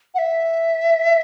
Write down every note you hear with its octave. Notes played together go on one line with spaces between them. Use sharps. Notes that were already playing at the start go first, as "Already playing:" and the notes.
F#5
E5